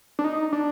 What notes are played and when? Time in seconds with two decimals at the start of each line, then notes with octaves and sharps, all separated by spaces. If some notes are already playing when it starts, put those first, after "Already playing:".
0.19 D4
0.24 D#4
0.53 D4